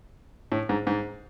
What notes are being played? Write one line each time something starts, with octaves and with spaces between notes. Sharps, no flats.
A2
G#2
G#2